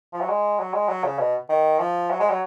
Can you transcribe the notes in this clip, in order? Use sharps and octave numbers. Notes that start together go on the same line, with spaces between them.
F3
F#3
G#3
F#3
G#3
F#3
C#3
B2
D#3
F3
F#3
G#3
F#3